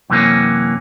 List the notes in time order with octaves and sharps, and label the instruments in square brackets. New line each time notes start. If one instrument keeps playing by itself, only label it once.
[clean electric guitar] F#2 C3 E3 A3 A#3 C#4